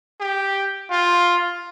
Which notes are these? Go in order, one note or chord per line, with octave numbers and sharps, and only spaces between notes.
G4
F4